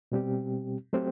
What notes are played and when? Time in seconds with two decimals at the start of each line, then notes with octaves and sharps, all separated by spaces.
0.12 B2 G3 C4 G4
0.93 F#3 A3 C4 G4 C5